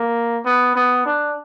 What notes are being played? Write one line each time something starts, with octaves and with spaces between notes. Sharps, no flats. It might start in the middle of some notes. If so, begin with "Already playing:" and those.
Already playing: A#3
B3
B3
D4